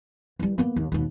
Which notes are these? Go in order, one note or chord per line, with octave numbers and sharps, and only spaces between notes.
E3 G3
A#3 B3
D#2
D#2 B2